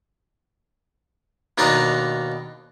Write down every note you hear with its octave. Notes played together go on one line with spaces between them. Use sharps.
D#2 B2 D4 D#4 D#5 A#5